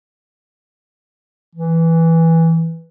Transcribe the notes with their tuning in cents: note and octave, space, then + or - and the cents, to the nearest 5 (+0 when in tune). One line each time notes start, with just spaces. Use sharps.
E3 -5